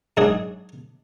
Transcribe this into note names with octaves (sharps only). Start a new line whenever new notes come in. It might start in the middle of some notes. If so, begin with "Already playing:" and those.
G#2 F#3 D4 G#4